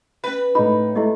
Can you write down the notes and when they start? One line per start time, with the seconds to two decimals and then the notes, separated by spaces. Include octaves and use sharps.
0.24 C#4 B4 E5
0.55 A2 D#4 B5
0.95 A3 E4 G4 D#5